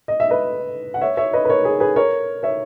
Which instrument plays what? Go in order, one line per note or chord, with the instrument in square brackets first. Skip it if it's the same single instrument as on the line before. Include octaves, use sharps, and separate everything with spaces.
[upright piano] D#5
E5
B4 D#5
F#5
C#5 E5
C#5 E5
B4 D#5
B4
A#4 C#5
G#4 B4
G#4 B4
A#4 C#5
C#5 E5